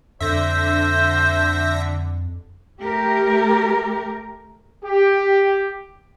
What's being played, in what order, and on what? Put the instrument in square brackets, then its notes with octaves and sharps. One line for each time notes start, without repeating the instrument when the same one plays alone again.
[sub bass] F2 [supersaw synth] D3 [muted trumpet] C5 [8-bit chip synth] E5 A#6
[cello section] A3 G4 A#4
[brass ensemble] G4